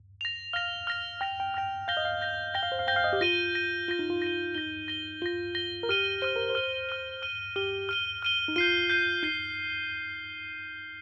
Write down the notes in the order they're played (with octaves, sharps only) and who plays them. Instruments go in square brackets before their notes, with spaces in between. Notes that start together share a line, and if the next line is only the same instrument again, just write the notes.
[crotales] A#6 F7
[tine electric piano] F5 [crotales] F6 A#6 F7
[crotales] F6 A#6 F7
[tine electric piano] G5 [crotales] F6 A#6 F7
[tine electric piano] G5
[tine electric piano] G5 [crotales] F6 A#6 F7
[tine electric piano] F5 [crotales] G6 A#6 G7
[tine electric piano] D#5
F5
[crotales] G6 A#6 G7
[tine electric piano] G5 [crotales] G6 A#6 G7
[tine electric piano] F5
C5
F5
[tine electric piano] G5 [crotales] G6 A#6 G7
[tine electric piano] F5
D#5
G4
[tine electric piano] F4 [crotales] A#6 D#7 G7
[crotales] A#6 D#7 G7
[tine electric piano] F4 [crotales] A#6 D#7 G7
[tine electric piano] D#4
F4
[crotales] A#6 D#7 G7
[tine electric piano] D#4 [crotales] A#6 G7
[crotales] A#6 G7
[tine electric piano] F4 [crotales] A#6 G7
[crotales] A#6 G7
[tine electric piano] A#4
[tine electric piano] G4 [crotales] F6 D#7 G7
[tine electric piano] C5 [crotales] F6 D#7 G7
[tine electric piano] A#4
C5
[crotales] F6 D#7 G7
F6 D#7 G7
F6 D#7 G7
[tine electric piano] G4 [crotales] F6 D#7 G7
[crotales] F6 D#7 G7
F6 D#7 G7
[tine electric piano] D#4
[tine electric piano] F4 [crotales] G6 C7 D#7
[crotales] G6 C7 D#7
[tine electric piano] D#4 [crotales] G6 C7 D#7